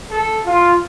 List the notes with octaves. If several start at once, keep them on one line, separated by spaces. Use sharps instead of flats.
A4
F4